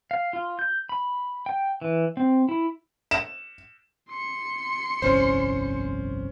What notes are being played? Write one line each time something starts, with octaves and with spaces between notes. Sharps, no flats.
F5
F4
G6
B5
G5
E3
C4
E4
E7
C6 C#7
G1 C2 F2 C#4 C5